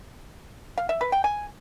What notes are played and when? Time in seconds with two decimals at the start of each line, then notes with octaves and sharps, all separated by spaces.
0.78 F5
0.89 E5
1.01 B4
1.12 G5
1.24 G#5